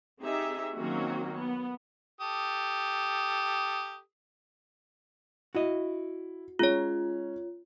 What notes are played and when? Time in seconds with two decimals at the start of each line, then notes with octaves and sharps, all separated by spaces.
0.20 C4 D#4 G4 G#4 E5
0.75 D#3 F#3 A#3 C4 C#4 F#4
1.38 B3
2.21 G4 A4 D#6
5.55 E4 F#4 D#5
6.59 G#3 C#4 F4 C#5